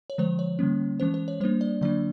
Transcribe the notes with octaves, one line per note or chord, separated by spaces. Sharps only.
C#5
D3 F3 G#3 C5
C#5
D3 G3 A#3 C#4
E3 G#3 C#4 C5
C5
C#5
G3 A#3 D4 C5
D5
D3 F#3 A#3 D4 D5